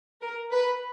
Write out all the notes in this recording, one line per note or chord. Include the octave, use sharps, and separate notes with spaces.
A#4
B4